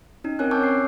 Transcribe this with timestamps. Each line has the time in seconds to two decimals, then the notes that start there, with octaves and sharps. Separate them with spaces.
0.24 C#4 D#4
0.39 C4 C#4 A#4 C#5 G#5 F#6
0.51 G#5 A5 C#6 D6 E6 G6
0.63 C7